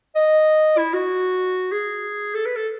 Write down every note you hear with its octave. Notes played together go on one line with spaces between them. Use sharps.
D#5
E4
F#4
G#4
A4
B4
A4